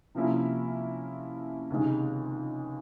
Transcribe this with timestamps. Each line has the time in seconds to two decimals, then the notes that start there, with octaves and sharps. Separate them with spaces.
0.15 C3 F3 A#3 C#4 E4
1.70 C#2 C3 D#3 G#3